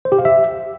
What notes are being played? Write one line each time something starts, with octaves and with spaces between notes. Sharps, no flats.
C5
G4
F5
E5